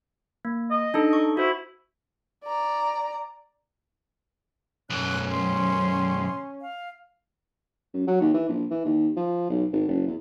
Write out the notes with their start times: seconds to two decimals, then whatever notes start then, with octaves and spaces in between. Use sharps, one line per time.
0.45 A#3
0.71 D#5
0.94 D4 D#4 A4
1.13 C#6
1.37 E4 F#4 C5
2.44 D5 A#5
4.90 B1 F#2 C#4 F#6
5.30 C6
6.61 F5
7.94 F#2
8.07 F#3
8.21 D#2
8.34 E3
8.48 A#1
8.70 E3
8.85 D#2
9.16 F3
9.50 B1
9.73 G#1
9.88 F#1
10.07 E2